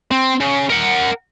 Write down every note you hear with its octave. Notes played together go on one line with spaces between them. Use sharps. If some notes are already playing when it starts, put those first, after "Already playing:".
C4
C#3
A#4 F#5